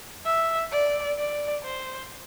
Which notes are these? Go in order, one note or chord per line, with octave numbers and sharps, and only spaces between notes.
E5
D5
D5
C5